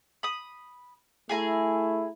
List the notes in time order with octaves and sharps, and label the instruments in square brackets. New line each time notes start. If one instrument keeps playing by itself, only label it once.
[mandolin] B5 D#6
[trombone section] A3 E4 [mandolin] G#4 G#5 A#5